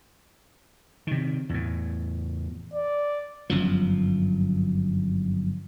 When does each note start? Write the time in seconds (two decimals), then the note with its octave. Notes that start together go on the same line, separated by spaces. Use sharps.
1.07 C3 D#3
1.49 E2 A2
2.74 D5
3.50 G1 F#2 F3